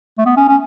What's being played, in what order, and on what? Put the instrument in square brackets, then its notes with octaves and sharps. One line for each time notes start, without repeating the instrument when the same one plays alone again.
[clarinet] A3
B3
C#4
C#4